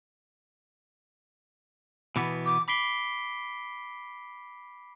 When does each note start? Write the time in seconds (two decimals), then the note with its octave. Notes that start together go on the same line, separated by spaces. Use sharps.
2.16 B2 E3 B3
2.46 D6
2.68 B5 D6 B6 C7 D7 G7